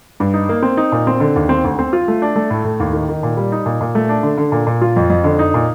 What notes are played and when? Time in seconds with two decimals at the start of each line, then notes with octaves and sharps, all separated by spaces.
0.20 G2
0.34 D#4
0.49 A#3
0.63 C4
0.77 D#4
0.92 A#2
1.07 C4
1.20 D3
1.36 D#2
1.49 C4
1.64 D2
1.79 C4
1.93 F4
2.08 A3
2.22 D4
2.36 A3
2.50 A2
2.64 A2
2.80 D#2
2.93 D#3
3.09 D#3
3.23 A#2
3.37 G3
3.52 D#4
3.66 A#2
3.81 A#2
3.95 A3
4.09 D4
4.23 D3
4.38 D3
4.52 A#2
4.67 A#2
4.81 F4
4.96 F2
5.10 F2
5.24 D3
5.39 D#4
5.54 A#2